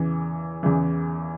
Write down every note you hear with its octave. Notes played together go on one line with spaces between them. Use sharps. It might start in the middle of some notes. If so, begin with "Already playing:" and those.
Already playing: E2 C#3 E3
E2 C#3 E3